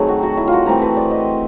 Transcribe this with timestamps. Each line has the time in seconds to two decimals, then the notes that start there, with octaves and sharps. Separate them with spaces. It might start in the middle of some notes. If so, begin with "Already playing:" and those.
Already playing: D#3 F#3 A3 C4 G#4
0.08 F#4
0.23 F#4
0.37 E4
0.48 F4
0.53 F#4
0.66 E3 A3 C4 A#4
0.82 B4
0.97 D5
1.11 D#5